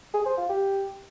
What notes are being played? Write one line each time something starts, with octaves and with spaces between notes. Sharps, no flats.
G#4
C5
F4
G4